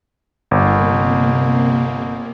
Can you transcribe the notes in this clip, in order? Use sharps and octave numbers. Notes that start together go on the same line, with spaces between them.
G1 C3 A#3